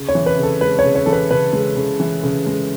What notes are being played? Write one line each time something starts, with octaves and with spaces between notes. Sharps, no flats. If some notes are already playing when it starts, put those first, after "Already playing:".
Already playing: C#3
C#5
E3
B4
C#3
A4
G#3 B4
C#5
C#3
C#5
E3 A4
B4
C#3 B4
G#3
C#3
E3
C#3
G#3